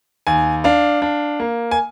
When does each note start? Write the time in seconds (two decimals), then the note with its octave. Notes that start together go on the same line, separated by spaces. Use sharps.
0.27 D#2 G#5
0.64 D4 F5
1.02 D4
1.40 A#3
1.71 G#5